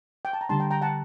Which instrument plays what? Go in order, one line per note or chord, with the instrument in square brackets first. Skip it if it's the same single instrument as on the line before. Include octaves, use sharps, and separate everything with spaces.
[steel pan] G5
A5
A#5
[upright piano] D3 G3 D4 [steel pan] A5 C6
[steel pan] G5 A#5
G5 A#5
F#5 A5